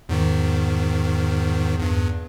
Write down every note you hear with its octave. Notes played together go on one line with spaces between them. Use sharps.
E2 G#2 D#3
E2 G2